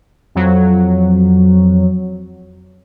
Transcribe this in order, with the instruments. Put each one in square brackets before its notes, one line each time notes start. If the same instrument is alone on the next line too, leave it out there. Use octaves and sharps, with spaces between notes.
[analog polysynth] F2 F#3